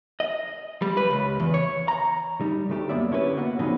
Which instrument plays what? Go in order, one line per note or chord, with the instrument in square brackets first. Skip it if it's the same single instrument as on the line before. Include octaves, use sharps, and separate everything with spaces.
[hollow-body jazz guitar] D#5
G3
B4
C#2
E2
C#5
A#5
G3 D#4
D2 A3 G4
F#2 A#3 B3 D5 E5
D3 C#4 E4 G4 G#4 B4
A#3 B3 F#4 F#5
A#2 C#3 F3 B3 C4 D#4